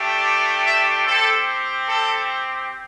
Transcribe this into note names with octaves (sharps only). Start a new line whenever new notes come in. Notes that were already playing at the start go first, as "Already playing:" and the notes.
Already playing: A3 D4 G4
E5
C4 G4 A4
A4